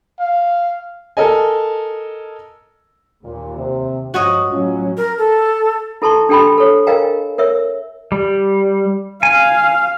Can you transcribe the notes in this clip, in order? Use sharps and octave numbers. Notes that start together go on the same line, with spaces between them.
F5
A4 A#4 D#5 G#5
D#2 A#2
C3
G2 F3 F#4 C#5 D#5
A2 F#3 C#4 F4
A#4
A4
E4 A4 A5 C6 C#6
D4 G4 A4 G5 B5 C6
A4 C#5
A#4 D#5 F5 G5 G#5 A#5
A#4 C#5 E5 E6
G3
F5 G#5